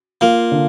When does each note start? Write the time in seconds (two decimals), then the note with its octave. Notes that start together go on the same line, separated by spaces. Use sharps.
0.21 A#3 F4
0.51 D3